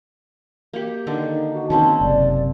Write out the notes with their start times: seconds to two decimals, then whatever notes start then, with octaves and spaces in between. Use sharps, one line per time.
0.73 A#3 G4
1.07 D3 D#3 D4 A#4
1.27 D#4
1.54 F#4
1.70 D#3 A#3 C4 C#4 A5
2.01 F#1 C3 D5